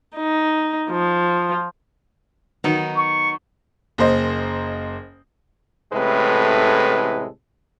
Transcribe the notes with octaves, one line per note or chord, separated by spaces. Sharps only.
D#4
F3
D#3 F#3 B3 D#4
C#6
F#1 A#3 C5 D#5
A1 A2 C3 G#3 A4 B4